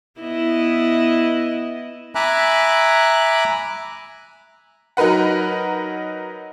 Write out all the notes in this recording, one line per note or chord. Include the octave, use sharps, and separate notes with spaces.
B3 E4 D#5
E5 G#5 A#5 B5 D6 F#6
F#3 D#4 A#4 B4 F#5